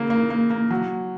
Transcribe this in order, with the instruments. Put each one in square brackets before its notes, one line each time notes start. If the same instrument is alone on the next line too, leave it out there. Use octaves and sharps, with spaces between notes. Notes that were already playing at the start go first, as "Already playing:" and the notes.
Already playing: [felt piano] C#3 A#3
A#3
A#3
A#3
F#3